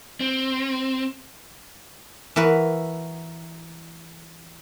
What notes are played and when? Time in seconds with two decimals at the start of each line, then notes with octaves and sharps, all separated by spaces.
0.21 C4
2.36 E3 F#4 A#4 B4